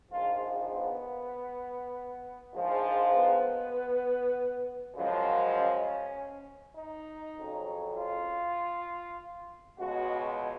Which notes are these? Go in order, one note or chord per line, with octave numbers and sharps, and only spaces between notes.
A#1 G#2 F3 F4
B3
A#1 G#2 F3 G#3
B3
F#2 C#3 F3 G#3
C#4
D#4
F2 C#3 F#3
F4
C#2 B2 G#3 F#4